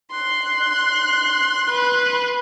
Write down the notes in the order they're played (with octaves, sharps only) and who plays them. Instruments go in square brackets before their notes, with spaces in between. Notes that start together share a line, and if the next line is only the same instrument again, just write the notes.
[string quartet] C6 F#6
[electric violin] B4